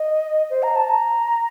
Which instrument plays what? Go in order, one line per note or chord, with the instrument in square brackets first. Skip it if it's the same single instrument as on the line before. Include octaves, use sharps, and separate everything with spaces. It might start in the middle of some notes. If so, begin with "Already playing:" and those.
Already playing: [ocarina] D#5
C5
A#5
A5
A#5